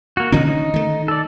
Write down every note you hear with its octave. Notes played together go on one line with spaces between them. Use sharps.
A#3 F#4
D3 D#3 C#4 D#4
D#4
D#3 A3
A4 D5